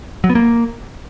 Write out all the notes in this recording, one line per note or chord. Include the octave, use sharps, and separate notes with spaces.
F#3
B3
A#3